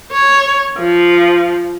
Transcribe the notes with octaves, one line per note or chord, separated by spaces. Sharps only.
C#5
F3